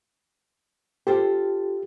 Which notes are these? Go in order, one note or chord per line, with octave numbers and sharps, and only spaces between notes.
F4 G4 A4 C5